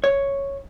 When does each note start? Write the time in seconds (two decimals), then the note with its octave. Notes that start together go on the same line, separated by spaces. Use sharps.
0.04 C#5